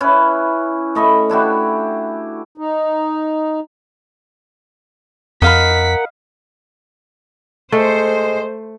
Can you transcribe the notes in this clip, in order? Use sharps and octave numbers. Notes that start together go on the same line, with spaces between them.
C#4 E4 B4
A3 D#5 B5 C#6
D4 E4 F#4 G4
D#4
F2 A#4 D#5 F5 F#5 B5 B6
G#3 A3 C5